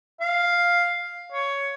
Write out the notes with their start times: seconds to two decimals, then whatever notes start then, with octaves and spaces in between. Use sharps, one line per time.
0.21 F5
1.32 C#5